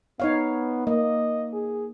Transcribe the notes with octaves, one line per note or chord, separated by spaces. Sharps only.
B3 D#4 C#5 F5
A#3 D#5
G#4